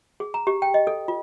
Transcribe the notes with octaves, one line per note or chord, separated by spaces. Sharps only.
G#4
A#5
G4
G5
D#5
A4
F4